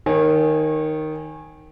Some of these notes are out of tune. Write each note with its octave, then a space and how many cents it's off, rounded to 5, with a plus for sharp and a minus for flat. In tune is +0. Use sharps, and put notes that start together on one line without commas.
D#3 +0 C#5 -35 G#5 +0